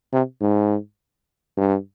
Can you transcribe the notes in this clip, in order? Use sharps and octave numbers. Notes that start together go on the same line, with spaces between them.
C3
G#2
G2